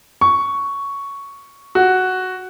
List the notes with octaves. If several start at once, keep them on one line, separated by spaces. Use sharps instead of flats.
C#6
F#4